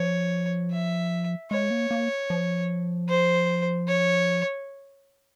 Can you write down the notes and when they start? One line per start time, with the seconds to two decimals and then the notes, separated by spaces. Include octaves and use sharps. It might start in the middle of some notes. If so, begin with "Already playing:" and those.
Already playing: F3 C#5
0.71 E5
1.51 G#3 C#5
1.71 A#3
1.91 A#3
2.30 F3
3.09 C5
3.88 C#5